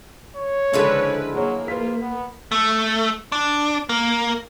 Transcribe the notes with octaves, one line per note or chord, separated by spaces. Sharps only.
C#5
C#2 D3 F3 G#3 E4 B4
F#3 A#3 G#4 C#5
F4 B4 B6
B3
A3
D4
A#3